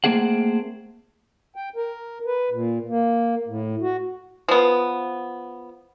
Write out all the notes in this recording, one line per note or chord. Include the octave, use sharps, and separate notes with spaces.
A3 A#3 C4 G#4 F#5
G5
A#4
B4
A#2
A#3
A2
F#4
F3 B3